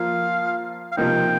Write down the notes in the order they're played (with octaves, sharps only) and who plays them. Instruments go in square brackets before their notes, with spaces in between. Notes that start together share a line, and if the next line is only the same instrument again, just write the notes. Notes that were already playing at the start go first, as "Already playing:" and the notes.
Already playing: [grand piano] F3 A#3 F4 [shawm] F5
[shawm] F5
[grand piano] C3 F3 A#3 D#4 [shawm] G5